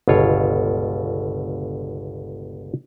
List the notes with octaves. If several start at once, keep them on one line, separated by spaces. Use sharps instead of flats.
G1 C#2 B2 F4 C#5